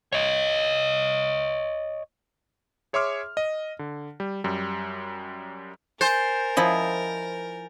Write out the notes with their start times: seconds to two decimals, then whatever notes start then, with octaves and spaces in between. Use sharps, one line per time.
0.13 C#5 D#5
2.93 G#4 C#5 E5 C6 D6 F6
3.37 D#5
3.79 D3
4.20 G3
4.44 F#2 G3
6.01 A#4 C5 G#5 G6 A6
6.57 F3 E4 D#5